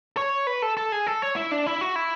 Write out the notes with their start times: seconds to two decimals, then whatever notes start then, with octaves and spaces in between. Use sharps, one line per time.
0.17 C#5
0.47 B4
0.62 A4
0.77 A4
0.92 G#4
1.07 A4
1.22 C#5
1.36 E4
1.51 D4
1.66 E4
1.81 F#4
1.96 E4